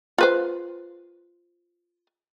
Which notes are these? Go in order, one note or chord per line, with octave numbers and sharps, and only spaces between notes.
F4 B4 C5